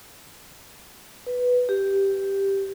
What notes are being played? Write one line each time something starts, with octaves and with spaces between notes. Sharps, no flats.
B4
G4